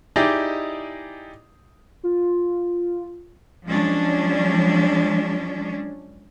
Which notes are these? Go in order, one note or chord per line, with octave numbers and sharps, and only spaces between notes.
D#4 E4 G4 G#4 D5 D#5
F4
F3 F#3 G#3 C#4 D4